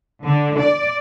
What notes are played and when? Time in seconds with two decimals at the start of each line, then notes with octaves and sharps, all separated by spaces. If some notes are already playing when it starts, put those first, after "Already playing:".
0.23 D3
0.58 D5